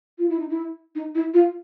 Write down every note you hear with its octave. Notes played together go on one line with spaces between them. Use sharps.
F4
E4
D#4
E4
D#4
E4
F4